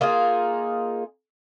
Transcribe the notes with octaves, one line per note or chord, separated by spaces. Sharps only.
A#3 D#4 F4 G#4